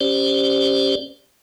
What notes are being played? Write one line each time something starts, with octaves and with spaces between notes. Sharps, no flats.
C#4 G4 C5 D5